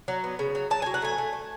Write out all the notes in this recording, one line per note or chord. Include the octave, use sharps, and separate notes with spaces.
F#3
B3
C#3
F#3
F#3 A5
F#3 G#5
F#5
A3 G#5
A3
A3